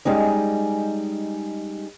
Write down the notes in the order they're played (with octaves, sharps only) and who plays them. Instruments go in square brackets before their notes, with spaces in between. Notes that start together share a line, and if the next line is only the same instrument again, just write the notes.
[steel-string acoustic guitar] G3 G#3 C#4 D#4